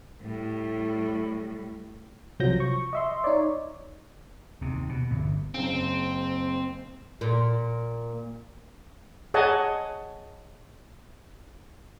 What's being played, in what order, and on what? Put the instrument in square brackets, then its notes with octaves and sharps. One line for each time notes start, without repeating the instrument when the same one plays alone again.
[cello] A2 G3
[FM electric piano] C2 F3 F#3 G6 A#6
C#6
D#5 E5 C6
D#4 C#5 D5
[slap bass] D#2 C3
B2
G1 E2
[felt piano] F#1 C#3 [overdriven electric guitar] C4
[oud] A#2
[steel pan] G#4 C#5 D#5 F#5 G#5 A5